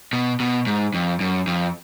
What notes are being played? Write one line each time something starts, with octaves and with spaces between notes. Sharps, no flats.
B2
B2
G#2
F2
F#2
F2